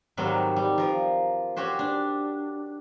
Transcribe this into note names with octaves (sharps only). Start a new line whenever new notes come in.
G#2 D#3 F#3 G3 C4
G3
F3 A#4
C#4 F#4 G4 C5
D4